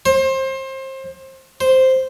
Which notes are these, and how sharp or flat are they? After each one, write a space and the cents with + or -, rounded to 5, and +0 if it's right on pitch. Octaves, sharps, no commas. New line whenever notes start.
C5 +25
C5 -5